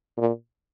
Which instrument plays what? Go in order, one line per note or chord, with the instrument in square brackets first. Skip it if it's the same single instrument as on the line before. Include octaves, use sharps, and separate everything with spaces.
[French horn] A#2